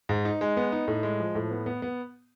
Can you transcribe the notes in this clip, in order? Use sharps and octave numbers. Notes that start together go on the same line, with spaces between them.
G#2
D#4
G#3
B3
D#4
A2
G#3
F3
A2
B3
B3
B3